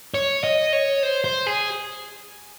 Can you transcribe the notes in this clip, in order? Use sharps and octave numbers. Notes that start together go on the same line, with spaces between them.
C#5
D#5
C#5
C5
C5
G#4